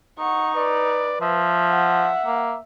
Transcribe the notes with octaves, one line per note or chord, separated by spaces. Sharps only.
D#4 F#5 C#6
B4 D5
F3 E5
F#5
A#3